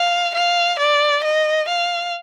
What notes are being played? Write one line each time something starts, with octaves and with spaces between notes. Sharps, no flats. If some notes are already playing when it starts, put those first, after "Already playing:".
Already playing: F5
F5
D5
D#5
F5